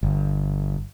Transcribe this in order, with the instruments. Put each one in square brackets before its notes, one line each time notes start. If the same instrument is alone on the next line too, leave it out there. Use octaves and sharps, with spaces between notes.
[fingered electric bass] G1